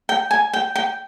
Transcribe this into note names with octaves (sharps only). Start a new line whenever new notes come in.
G5
G#5
G5
G5